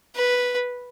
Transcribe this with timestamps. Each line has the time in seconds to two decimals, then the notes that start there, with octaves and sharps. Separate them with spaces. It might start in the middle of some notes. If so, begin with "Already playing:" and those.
0.15 B4